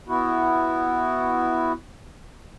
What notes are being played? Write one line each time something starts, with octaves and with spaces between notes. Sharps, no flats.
B3 E4 F#4